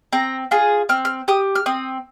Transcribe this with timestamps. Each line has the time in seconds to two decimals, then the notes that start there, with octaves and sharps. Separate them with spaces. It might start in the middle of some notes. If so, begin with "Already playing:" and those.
0.12 C4 A#5
0.51 F4 G#4
0.89 C4 F6
1.05 F6
1.28 G4 D#6
1.55 F6
1.66 C4 D#6